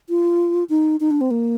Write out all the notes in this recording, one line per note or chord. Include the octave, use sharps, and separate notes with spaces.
F4
D#4
D#4
D4
C4
A#3